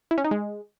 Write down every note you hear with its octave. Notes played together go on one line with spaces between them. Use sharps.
E4
C#4
D#4
G#3